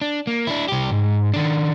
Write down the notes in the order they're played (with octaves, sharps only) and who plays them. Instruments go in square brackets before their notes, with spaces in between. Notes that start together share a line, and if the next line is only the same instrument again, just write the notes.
[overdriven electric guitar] D4
A#3
D4 E4
C2 G4
G#2
D#3 D4